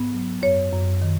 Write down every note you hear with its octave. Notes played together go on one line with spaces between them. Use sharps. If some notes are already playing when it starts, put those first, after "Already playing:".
Already playing: G#2 B3
F#3
F#2 C#5
F#2
D#3